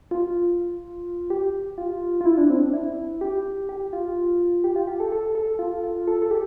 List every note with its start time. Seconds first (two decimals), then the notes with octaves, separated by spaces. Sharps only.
0.11 F4
1.30 G4
1.78 F4
2.21 F4
2.26 E4
2.38 D4
2.50 C4
2.62 D4
2.73 E4
3.21 G4
3.69 G4
3.93 F4
4.64 G4
4.76 F4
4.87 G4
5.00 A4
5.12 A4
5.35 A4
5.59 F4
5.84 F4
6.07 A4
6.22 A4
6.31 G4